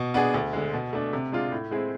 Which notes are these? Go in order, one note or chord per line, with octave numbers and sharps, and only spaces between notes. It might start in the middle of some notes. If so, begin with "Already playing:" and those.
Already playing: B2
B3 D4 G#4
D2
D3 G#3
B2
A3 D4
C3
G#3 D4 F4
A2
G#3 C4 E4 G#4